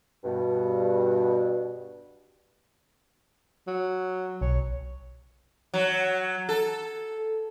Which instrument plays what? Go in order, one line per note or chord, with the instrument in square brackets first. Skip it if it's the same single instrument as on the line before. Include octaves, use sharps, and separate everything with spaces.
[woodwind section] G2 B2
[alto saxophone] F#3
[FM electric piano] B1 [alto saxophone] C#5
[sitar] F#3
A4